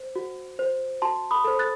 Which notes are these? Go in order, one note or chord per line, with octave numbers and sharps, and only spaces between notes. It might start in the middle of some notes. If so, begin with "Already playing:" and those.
Already playing: C5
F#4
C5
F#4 A5 C6
B5 D#6
A4 C5
F#6 A6